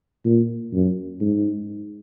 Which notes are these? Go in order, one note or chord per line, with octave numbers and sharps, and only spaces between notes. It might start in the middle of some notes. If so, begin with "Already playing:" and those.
A#2
F#2
G#2